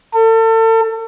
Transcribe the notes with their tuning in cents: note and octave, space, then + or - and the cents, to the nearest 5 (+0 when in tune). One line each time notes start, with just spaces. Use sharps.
A4 +40